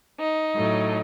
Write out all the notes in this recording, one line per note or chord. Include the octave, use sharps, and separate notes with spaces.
D#4
A2 F#3 A3